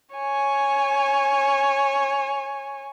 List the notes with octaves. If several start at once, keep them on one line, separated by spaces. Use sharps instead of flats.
C#5 G#5